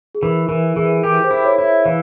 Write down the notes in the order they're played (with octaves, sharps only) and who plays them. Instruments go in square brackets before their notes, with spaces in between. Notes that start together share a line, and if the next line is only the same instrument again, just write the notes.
[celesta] G#4
[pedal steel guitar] E3 [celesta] A#4
[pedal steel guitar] E3 [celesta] A#4
[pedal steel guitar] E3 [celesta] G#4
[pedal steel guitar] G4 [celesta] A#4
[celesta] C5
[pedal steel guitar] E4
[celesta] C#5
[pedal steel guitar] E4
[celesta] E5
[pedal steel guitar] E3 [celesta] F5